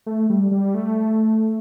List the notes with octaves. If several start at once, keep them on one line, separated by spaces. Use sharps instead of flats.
A3
G3
G3
A3